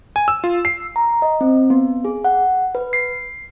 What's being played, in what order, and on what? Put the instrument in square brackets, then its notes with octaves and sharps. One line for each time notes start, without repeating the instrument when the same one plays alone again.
[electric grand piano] G#5
E6
F4
C7
[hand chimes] A#5
D#5
C4
B3
G#4
F#5
B4
C7